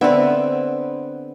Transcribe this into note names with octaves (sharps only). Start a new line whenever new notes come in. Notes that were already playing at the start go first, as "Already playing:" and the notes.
D3 B3 C4 E5 G5